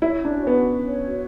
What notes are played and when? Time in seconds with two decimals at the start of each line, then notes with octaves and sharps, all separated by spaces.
0.02 E4 C#5
0.19 C#4
0.25 D4
0.36 F#4
0.47 B3
0.54 C#4
0.71 C#4
0.87 C#5
1.04 F#4